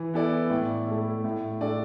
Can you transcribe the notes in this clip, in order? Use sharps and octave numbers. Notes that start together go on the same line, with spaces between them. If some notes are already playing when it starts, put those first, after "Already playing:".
Already playing: E3
B3 E4 A4 D5
A2
A3 E4
A2
A3 D4 A4 D5